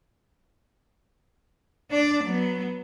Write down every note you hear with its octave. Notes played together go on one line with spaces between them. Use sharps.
D4 D5
F#3 B3